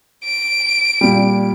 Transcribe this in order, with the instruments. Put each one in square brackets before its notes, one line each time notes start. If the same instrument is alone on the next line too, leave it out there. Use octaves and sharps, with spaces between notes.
[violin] D7
[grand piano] A#2 G3